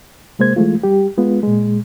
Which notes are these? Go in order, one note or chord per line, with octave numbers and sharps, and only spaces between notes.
C3 G#3 A#3 C5 G#6
E3 G#3 A3 F4
G3 G4
G#3 B3 F4
A#2 G#3